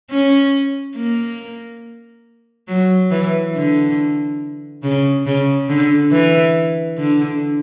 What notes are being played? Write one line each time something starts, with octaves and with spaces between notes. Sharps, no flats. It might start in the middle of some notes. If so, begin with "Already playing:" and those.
C#4
A#3
F#3
E3
D3
C#3
C#3
D3
E3
D3